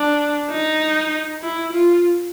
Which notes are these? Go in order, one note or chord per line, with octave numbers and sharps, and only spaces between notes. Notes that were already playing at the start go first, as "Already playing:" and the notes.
Already playing: D4
D#4
E4
F4